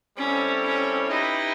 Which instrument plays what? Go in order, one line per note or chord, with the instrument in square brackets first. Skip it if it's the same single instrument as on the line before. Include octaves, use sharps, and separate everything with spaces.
[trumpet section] G3 C4 E4 A4 C#5 [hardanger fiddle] C#4
[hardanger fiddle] C#4
[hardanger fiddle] D#4 [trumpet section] E4 G4 B4 D#5